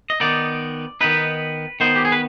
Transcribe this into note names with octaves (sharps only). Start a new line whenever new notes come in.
D#5
D#3 B3 D#4 D5
D#3 B3 D#4 B4
D#3 B3 D#4 C5
G4
G#4
B4